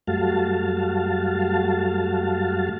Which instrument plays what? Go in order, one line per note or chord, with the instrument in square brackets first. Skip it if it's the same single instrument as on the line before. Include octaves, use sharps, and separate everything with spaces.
[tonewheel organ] F#2 G3 A3 F#4 F5 A5